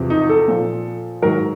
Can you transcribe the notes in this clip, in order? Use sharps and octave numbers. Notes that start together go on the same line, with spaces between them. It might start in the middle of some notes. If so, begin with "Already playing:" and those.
Already playing: E2 C3 F3
D#4
A4
A#2 F3
G#2 D#3 F#3 A#4